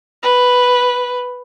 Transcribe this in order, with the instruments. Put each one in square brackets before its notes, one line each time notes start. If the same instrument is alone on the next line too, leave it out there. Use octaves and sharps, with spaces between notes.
[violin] B4